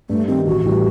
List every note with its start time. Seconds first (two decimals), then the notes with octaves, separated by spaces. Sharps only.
0.10 G2 A3
0.28 D#3 G3 C4
0.46 A1 F#4
0.65 A2 E3 G3